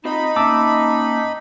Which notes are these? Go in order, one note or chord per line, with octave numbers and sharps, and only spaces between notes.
C4 D#4 F4 D#5 B5
A#3 C#4 E5 A5 D6 E6